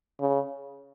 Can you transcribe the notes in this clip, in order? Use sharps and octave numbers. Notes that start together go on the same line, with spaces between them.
C#3